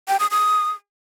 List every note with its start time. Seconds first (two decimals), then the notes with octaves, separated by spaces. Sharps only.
0.08 G5
0.20 D#6
0.31 D#6